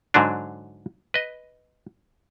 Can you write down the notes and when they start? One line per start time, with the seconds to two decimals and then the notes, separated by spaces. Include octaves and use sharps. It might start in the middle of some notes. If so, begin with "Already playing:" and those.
0.14 G#2 D3 F#3 D4
1.14 B4 D#5